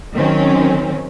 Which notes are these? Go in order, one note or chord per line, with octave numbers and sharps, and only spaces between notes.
D#3 F#3 C4 C#4